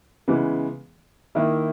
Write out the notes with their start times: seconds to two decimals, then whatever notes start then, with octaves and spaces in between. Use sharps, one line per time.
0.28 C#3 E3 G#3 B3
1.35 D#3 A#3 E4